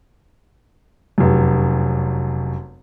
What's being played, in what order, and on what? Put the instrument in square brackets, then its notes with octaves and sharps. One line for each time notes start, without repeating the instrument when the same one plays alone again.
[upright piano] F1 F#2